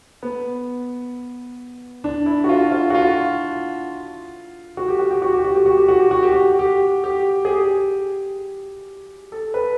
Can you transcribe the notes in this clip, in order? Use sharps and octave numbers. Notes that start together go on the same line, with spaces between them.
B3
D4
E4
F#4
F4
F4
F#4
F4
F#4
G4
F#4
G4
F#4
G4
F#4
G4
F#4
G4
F#4
G4
F#4
G4
F#4
G4
G4
G#4
G4
A4
B4